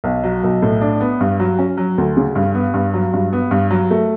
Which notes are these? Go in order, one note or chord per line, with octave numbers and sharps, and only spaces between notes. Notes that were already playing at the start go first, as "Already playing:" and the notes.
B1
F#3
B1
A2
D4
B3
G2
F#3
C#4
F#3
D2
C#3
G2
B3
G2
F#3
G2
B3
G2
F#3
A3